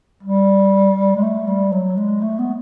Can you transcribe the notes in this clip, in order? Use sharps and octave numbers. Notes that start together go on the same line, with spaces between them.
G3
G#3
A3
G3
F#3
G#3
A3
B3